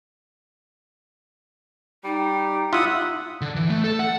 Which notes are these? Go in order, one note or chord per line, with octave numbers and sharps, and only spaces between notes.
G3 D#4
E4 F4 E5 F#5 D#6
D3
E3
A3
A4
F#5